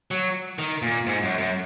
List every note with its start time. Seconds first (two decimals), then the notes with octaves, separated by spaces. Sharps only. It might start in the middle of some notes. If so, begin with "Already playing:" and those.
0.11 F#3
0.59 D#3
0.82 A#2
1.06 G#2
1.23 F#2
1.38 F#2